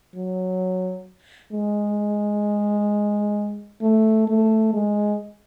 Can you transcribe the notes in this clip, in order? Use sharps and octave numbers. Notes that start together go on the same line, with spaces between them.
F#3
G#3
A3
A3
G#3